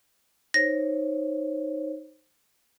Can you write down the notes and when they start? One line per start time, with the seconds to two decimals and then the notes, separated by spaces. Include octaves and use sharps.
0.54 D#4 C5 C#5 A#6